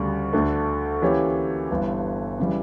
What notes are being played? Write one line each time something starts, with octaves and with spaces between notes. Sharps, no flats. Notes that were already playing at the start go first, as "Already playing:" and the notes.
Already playing: D2 C#3 G3
D2 D3 A3
E3 A#3 C#4 G4 C#5
G1 G2 E3
C#3 E3 G3